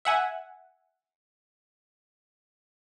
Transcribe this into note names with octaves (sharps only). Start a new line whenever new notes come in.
E5 F#5 G#5